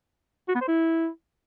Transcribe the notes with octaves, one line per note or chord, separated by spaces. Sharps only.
F#4
B3
C5
E4